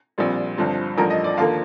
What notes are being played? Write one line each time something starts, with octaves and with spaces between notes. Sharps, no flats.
A#1 A#2 G3 C4
G1 G2 F3 C4
A1 G2 F3 A3 A#4
D#5
D5
D#2 D3 F3 A#3 F5